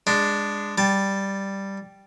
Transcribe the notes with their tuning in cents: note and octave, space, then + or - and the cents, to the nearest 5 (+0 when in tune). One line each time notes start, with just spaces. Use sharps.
G#3 -15 D4 +0
G3 +0 A5 -10